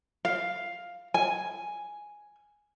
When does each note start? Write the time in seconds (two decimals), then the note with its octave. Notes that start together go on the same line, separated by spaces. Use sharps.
0.25 F5
1.14 G#5